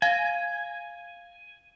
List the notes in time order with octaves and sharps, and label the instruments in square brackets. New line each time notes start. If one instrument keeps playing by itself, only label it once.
[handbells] F5 [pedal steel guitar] G#5